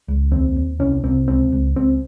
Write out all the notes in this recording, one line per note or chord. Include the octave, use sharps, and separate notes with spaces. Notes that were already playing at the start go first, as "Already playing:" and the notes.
C#2
D#2 C4
D#2
C2 C#4
C2 C4
C#2 C4
C#2
C#2 C4